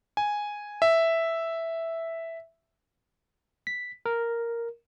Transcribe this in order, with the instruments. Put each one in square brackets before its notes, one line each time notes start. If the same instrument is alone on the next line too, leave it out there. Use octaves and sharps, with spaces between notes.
[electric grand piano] G#5
E5
[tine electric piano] B6
A#4